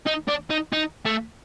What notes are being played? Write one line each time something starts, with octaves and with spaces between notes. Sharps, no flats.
D#4
D4
D#4
D#4
A3